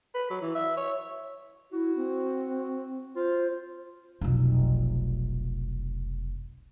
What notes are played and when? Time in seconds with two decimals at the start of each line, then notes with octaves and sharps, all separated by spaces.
0.15 B4
0.30 F#3
0.41 E3
0.55 E5
0.77 C#5
1.72 E4 F#4
1.96 C4
3.16 F4 C5
4.21 F1 B1